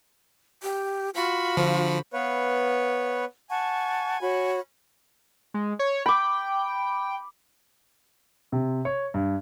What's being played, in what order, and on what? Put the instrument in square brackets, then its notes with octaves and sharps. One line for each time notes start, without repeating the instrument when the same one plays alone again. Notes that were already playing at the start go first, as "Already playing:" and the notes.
[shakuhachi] G4
[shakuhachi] F4 [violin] F#4 B5
[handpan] D3 C5 F#5 [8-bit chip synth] F3
[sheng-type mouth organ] B3 B4 C#5 [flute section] F5
[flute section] F#5 A5 C#6 [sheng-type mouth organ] G#5
[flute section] F#4 C#5 B5
[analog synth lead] G#3
C#5
[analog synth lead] G5 [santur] B5 D6
[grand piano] C3
C#5
G2